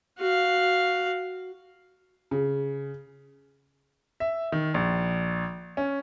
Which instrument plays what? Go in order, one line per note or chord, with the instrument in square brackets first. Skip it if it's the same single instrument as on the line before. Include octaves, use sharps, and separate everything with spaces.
[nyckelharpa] F#4 F5
[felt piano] C#3
[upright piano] E5
D#3
A#1
C#4